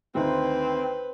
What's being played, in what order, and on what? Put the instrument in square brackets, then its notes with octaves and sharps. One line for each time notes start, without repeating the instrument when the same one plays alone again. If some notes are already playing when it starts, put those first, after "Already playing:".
[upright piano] D2 D#3 [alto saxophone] C4 [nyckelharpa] B4 C5